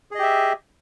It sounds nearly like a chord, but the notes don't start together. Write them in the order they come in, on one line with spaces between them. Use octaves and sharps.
G#4 D#5 G4 E5